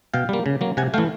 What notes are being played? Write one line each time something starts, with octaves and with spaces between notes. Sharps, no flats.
B2 F5 G5
G3 A#3
C#3
F#3 A#3
C3 F#5 G#5
E3 A3 F5 G5